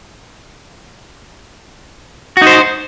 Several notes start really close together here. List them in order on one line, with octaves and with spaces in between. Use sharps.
F#4 D#4 C5